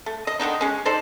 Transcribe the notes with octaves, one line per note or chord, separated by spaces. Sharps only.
A3
D#5
D3 D#3 D4 D#4
G#3 C#4
D#4 A4 C5 D5